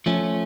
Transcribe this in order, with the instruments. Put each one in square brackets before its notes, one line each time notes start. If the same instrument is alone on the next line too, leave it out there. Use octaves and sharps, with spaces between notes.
[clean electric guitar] F3 A3 C#4